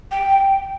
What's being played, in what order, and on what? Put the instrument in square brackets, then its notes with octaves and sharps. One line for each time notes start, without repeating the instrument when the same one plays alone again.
[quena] G5